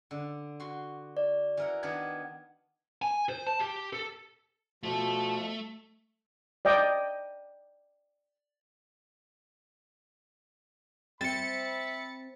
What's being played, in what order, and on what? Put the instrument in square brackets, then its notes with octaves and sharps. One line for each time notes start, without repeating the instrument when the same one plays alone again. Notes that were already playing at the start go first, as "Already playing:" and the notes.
[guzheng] D3
F#4 C6
[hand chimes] D5
[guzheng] E3 A#4 F#5
[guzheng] D#3 B3 D4 [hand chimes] G#6
[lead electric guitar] G#5
C5
A5
G4
A4
[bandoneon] B2 F3 [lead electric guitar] A3
[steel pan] D5 D#5 G5
[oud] C4 [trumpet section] E5 B5 [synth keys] A6 C#7